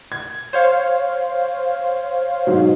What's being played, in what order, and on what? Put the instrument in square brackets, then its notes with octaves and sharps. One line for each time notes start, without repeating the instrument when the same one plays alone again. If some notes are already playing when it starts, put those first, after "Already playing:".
[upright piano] G#6
[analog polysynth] C5 C#5 F5
[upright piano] G#2 B2 F#3